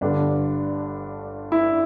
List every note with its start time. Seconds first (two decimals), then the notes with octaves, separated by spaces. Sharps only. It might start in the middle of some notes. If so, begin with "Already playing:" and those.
0.01 G1 G2 D3 D4
1.52 E4